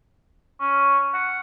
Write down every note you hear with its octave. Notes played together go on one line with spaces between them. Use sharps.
C#4
F#5